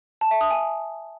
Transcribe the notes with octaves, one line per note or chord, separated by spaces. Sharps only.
A5
E5
D#6
G#5